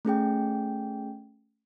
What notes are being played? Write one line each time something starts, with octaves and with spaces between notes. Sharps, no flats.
A3 C#4 G#4 G5